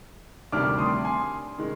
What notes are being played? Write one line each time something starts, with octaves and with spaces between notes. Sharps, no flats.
D2 C3 D#3 G3 D4 D6 F6
C6 D#6
G#5 C6
D#3 G#3